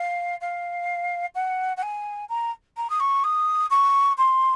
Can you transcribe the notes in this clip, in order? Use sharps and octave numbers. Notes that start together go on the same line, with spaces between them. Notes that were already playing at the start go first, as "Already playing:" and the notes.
Already playing: F5
F5
F#5
F#5
G#5
A#5
A#5
D#6
C#6
D#6
C#6
C6